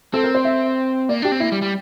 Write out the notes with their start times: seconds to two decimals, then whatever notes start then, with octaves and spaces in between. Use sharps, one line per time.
0.14 C4 A4
0.24 A#4
0.35 C5
0.45 E5
1.09 A#3 D5
1.22 D4 G4
1.32 C4
1.40 A#3 E4
1.52 G3
1.62 G3